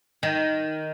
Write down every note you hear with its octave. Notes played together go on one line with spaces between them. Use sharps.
D#3